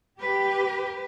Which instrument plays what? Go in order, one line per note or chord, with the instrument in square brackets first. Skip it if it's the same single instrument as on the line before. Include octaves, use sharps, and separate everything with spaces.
[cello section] G4 [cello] B4